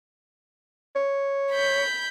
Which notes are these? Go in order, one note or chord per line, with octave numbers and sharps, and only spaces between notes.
C#5
B5 G6